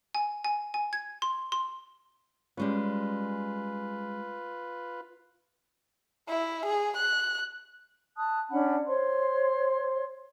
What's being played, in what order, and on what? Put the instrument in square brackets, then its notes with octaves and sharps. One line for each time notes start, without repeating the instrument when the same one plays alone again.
[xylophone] G#5
G#5
G#5
G#6
C6
C6
[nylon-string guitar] G3 G#3 C#4 [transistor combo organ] F4 B4
[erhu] E4
G#4
F#6
[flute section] A5 D#6 F#6
C#4 D4 F#5 B5
C5 C#5 C6